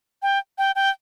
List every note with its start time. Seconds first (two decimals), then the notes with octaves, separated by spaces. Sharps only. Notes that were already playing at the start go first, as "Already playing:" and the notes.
0.22 G5
0.58 G5
0.76 G5